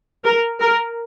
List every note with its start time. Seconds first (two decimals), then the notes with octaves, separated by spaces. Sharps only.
0.24 A#4
0.60 A#4